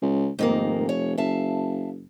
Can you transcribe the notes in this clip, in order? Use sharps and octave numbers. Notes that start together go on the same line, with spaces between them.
C#2
F1 G#2 D#3 A#3
C#5
F#1 E5 F5 A5